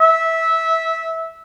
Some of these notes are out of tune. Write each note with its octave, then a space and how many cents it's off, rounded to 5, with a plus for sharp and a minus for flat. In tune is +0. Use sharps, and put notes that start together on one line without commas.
E5 -15